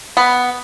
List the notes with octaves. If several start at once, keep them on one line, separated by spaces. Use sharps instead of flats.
B3